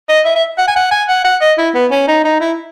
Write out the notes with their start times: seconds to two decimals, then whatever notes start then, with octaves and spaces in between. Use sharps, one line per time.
0.09 D#5
0.25 E5
0.36 E5
0.58 F#5
0.68 G#5
0.76 F#5
0.91 G#5
1.08 F#5
1.25 F#5
1.41 D#5
1.58 E4
1.75 B3
1.91 C#4
2.08 D#4
2.24 D#4
2.40 E4